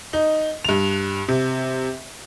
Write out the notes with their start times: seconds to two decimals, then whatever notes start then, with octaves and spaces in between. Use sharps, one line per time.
0.13 D#4
0.65 G2 F7
1.28 C3